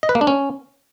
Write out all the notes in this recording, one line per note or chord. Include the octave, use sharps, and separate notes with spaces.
D#5
B4
A#3
D4
C#4